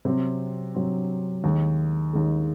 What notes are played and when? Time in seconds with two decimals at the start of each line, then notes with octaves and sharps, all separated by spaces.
0.05 C3 F#3 C4
0.74 C3 F#3 C4
1.44 D#2 D#3 G#3
2.13 D#2 D#3 G#3